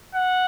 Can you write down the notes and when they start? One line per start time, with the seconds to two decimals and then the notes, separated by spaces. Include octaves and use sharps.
0.14 F#5